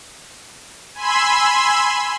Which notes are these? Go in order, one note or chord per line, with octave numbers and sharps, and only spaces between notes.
G#5 B5 C6 E6